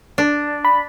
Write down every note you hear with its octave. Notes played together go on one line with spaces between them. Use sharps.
D4
B5